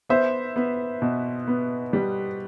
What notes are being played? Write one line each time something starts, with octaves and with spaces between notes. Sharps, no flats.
B3 C5 E5
B3
B2
B3
G3